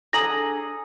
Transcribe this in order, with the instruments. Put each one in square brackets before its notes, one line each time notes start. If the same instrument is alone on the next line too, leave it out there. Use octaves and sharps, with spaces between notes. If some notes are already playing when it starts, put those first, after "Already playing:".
[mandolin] D4 G#4 A#5 [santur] A4 D#6 [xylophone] A#6 F#7